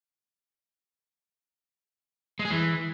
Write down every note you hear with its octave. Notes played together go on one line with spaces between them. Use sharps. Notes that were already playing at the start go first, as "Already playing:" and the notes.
G#3
G#4
E3